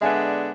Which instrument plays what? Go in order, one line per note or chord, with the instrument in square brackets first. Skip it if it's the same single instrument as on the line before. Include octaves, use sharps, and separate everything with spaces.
[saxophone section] D3 G#3 B3 D4 [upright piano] E5 G#5